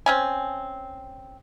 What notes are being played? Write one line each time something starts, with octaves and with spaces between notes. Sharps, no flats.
C4 C#4 G#5